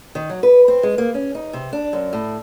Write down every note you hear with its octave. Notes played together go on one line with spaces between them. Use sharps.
D#3
F#3
B4
C4
G#3
A#3
C#4
D#4
C3
D4
F#2
A2